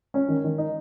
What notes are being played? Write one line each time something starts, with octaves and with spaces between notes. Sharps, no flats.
C#4
D#3
D#3
D#4